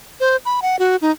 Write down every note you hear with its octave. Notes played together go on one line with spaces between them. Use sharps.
C5
B5
F#5
F#4
D#4